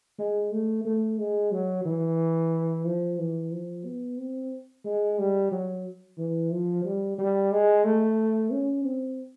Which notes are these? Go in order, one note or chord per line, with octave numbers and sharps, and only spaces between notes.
G#3
A3
A3
G#3
F#3
E3
F3
E3
F3
B3
C4
G#3
G3
F#3
E3
F3
G3
G3
G#3
A3
C#4
C4